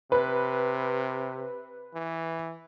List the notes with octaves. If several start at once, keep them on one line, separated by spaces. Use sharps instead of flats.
C3 B4
E3